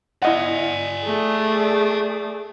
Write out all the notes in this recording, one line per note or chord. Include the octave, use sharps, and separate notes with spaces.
E4 D5 D#5 F#5 G#5
A3 G#4